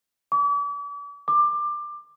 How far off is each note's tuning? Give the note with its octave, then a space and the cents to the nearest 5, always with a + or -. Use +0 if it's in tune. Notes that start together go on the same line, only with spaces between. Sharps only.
D6 -40
D6 +20